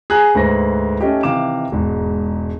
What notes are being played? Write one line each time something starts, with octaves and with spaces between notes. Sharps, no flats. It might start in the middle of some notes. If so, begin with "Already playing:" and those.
G#4 A#5 F#6
D2 G#2 B4 C5 A#6
A3 C#4 D#4 G4
C3 D#3 E3 F5 D6 E7
E1 G#2